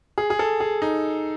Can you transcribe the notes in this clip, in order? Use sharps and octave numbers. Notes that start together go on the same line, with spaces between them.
G#4
G#4
A4
G#4
D#4